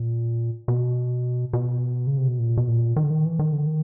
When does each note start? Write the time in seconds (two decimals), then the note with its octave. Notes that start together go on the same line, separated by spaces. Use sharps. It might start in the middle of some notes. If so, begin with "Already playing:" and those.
Already playing: A#2
0.68 B2
1.53 B2
2.07 C#3
2.17 C3
2.28 B2
2.39 A#2
2.57 B2
2.68 A#2
2.96 D#3
3.03 D3
3.10 D#3
3.25 E3
3.39 D#3
3.53 D3
3.66 D#3